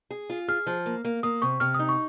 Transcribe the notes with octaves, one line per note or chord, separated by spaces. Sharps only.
G#4
F4
G#4 F6
F3
A#3
A#3
A#3 D#6
C3 C#6
C3 F6
D#4 D#6
C#6